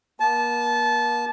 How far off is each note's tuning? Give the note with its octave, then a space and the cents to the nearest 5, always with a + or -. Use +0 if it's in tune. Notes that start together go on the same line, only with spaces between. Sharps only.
A#3 +40 A5 -20